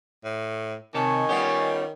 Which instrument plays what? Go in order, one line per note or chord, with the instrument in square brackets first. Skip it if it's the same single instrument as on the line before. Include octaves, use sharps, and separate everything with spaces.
[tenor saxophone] A2
[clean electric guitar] C3 C#5 A5 [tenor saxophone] D#3 [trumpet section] D#5 G#5 C#6
[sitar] G3 B3 C#4 [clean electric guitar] F4 G4